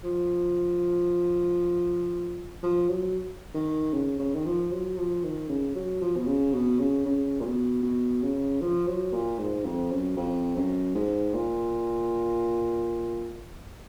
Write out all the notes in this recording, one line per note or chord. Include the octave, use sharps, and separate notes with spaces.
F3
F3
F#3
D#3
C#3
C#3
D#3
F3
F#3
F3
D#3
C#3
F#3
F3
B2
C#3
B2
C#3
C#3
A#2
B2
B2
C#3
F3
F#3
A#2
G#2
F2
F#2
F2
F#2
G#2
A#2